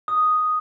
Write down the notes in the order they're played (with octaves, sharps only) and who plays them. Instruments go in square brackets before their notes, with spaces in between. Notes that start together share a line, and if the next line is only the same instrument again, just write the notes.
[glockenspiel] D#6